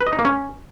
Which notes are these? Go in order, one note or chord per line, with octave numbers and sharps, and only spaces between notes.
B4
D#5
D#4
A#3
C#4